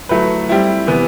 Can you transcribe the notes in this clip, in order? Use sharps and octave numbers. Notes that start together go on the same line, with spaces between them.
F#3 A3 E4 B4
G3 C4 E4
C3 E3 B3